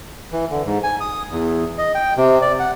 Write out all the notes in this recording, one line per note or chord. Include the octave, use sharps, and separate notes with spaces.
E3
D3
G#2
G#5
D#6
E2
D#5
G5
C3
D5
F#5